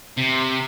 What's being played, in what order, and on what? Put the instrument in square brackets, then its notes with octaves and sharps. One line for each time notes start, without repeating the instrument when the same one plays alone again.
[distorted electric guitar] C3